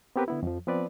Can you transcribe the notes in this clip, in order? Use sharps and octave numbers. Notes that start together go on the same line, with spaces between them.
B3 C4 G4 A#4 B4
D3 B3 E4
F2 F3
F3 B3 C4 B4 D5